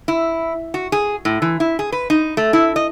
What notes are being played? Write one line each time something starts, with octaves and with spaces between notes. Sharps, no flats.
E4
F#4
G#4
A2
E3
E4
G#4
B4
D#4
A3
E4
D#5